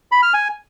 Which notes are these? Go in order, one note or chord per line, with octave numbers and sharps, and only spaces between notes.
B5
F6
G#5